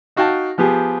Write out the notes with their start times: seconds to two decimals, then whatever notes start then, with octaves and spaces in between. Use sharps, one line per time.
0.16 D#4 F#4 F5 G5 A5
0.58 F3 B3 G4 G#4